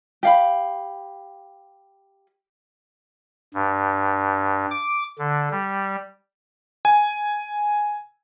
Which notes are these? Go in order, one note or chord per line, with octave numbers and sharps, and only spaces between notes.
G4 F5 B5
G2
D6
D3
G3
G#5